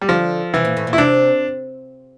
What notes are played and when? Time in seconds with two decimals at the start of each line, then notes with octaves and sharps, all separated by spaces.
0.01 G3
0.09 D3 F3
0.54 C3 E3
0.65 A#2
0.77 A2
0.87 A#2
0.93 E4
0.98 C3 D4